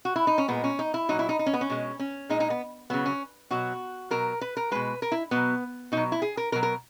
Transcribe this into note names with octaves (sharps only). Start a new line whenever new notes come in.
F#4
E4
D#4
C#4
A#2 G#3 B3
C#4
D#4
E4
A#2 F#3 D#4
E4
D#4
D#4
C#4
B3
C#4
B2 G#3
C#4
A#2 G#3 D#4
D#4
B3
C#3 F#3 B3
C#4
B2 F#3 F#4
B2 F#3 A#4
B4
A#4
B2 G#3 B4
A#4
E4
B2 F#3 B3
B2 F#3 D#4
E4
G#4
A#4
B2 F#3 A#4
A#4